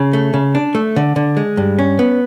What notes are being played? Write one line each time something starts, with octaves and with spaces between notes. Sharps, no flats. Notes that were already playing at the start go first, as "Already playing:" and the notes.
Already playing: C#3
A3
C#3
D4
A3
D3
D3
G#3
G2
C#4
B3